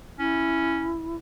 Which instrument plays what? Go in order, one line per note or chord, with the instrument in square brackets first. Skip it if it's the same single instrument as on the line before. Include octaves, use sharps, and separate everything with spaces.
[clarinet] C#4 [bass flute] E4